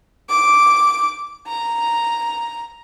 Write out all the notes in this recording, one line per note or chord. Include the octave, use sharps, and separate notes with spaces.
D6
A#5